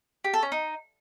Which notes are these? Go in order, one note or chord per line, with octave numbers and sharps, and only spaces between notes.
G4
A4
C#4
D#4